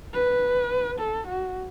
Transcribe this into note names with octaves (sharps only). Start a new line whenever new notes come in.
B4
A4
F#4